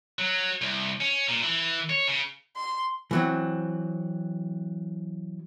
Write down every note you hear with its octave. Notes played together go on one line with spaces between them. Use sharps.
F#3
C2
C#4
A#2
E3
C#5
C#3
C6
E3 F#3 C4